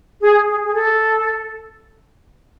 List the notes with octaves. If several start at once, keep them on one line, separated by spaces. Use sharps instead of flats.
G#4
G#4
G#4
A4